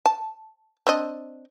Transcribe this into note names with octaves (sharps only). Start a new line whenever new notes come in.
A5
C4 D4 D#5